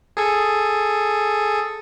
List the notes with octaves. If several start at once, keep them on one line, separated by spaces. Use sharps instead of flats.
G#4 A4 G#5